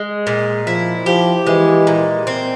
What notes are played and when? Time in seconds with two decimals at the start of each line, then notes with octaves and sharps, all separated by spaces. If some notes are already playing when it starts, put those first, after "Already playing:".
Already playing: G#3
0.27 A#2
0.66 F3 E4
1.06 F3 G4
1.46 E3 G#3
1.87 A#2
2.27 C4